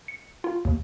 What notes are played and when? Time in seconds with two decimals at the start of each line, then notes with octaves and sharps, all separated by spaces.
0.08 C#7
0.44 F4
0.65 D#2